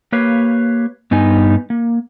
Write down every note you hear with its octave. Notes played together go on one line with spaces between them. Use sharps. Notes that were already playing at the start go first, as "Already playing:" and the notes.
A#3 G4 B4 C#5 F5
G2 B3 D#4 G#5
A#3